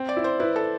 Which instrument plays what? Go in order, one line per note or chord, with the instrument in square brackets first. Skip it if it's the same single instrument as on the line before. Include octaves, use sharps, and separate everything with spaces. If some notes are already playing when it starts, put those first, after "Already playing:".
Already playing: [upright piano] C4
[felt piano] D5
[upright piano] E4
[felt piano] C5
[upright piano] E4 [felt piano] B4
[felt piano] A4